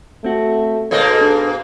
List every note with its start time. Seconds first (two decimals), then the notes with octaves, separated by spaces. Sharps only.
0.24 A3 C4 F#4
0.91 G#2 B2 A#3 A4 C#5 D#5
1.21 D4